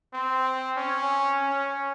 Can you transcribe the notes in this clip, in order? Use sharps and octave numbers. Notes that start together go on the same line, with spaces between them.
C4
C#4
C#4